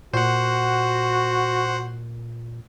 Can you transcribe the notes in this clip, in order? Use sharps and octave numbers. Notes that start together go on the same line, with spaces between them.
A#2 F#4 C5 F#5